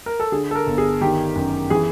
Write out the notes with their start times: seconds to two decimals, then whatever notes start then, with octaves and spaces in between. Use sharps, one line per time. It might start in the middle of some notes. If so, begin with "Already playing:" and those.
0.06 A#4
0.20 A4
0.32 D3 G#4
0.51 A4
0.55 A#4
0.67 G1
0.78 G#4
1.01 D#3 G4
1.36 F#2
1.70 E3 G#4